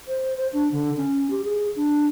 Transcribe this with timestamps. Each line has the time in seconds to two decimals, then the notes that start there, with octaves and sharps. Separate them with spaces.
0.08 C5
0.37 C5
0.53 D4
0.72 D3
0.97 C#4
1.30 G4
1.45 G#4
1.76 D4